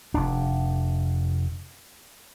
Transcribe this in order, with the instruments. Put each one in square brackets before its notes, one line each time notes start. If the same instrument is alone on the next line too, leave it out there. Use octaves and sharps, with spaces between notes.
[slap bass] F1 D4